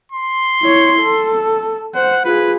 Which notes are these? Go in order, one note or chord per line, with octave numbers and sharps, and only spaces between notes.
C6
E4 C#5
A4
C5 F#5
F4 G#4 B4